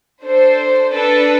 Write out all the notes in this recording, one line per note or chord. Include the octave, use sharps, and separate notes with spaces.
D4 A4 C5
D4 A4 B4